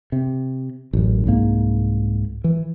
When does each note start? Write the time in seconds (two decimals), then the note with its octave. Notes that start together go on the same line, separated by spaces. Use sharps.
0.12 C3
0.93 A1 F#2
1.25 C2 G#2 A#3
2.44 E3